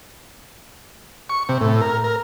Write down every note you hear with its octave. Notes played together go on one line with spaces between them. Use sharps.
C#6
C3
A2
A#4
A#4